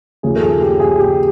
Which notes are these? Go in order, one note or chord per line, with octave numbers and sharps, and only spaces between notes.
D#2 C#3 F3 G#4
A4
G#4
G4
G#4
G4